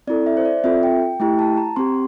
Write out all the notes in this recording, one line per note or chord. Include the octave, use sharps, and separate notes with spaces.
C4 E4 A4 D5
E5
C5
D5
C4 F4 A4 E5
G5
A3 E4 G4 G5
A5
A#5
C4 G4 C6